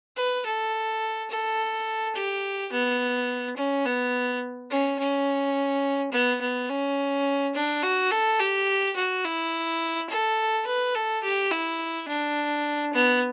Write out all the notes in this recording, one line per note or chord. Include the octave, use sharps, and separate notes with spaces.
B4
A4
A4
G4
B3
C#4
B3
C#4
C#4
B3
B3
C#4
D4
F#4
A4
G4
F#4
E4
A4
B4
A4
G4
E4
D4
B3